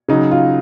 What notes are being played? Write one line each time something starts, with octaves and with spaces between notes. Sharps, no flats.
C#3 F#3 D#4
F4